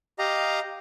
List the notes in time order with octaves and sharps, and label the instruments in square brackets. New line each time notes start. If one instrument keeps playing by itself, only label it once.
[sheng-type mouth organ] G4 D#5 F5 A#5